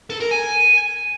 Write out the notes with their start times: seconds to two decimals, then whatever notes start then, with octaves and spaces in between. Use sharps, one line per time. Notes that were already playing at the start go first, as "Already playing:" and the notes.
0.10 A4
0.20 A#4
0.31 G#5